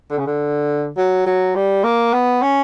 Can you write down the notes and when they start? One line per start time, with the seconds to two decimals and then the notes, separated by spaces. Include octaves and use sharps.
0.10 D3
0.18 C#3
0.26 D3
0.97 F#3
1.26 F#3
1.55 G3
1.84 A#3
2.13 B3
2.42 C#4